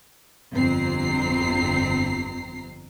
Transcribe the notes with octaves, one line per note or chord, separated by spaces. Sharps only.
G1 F2 C4 A#5 C7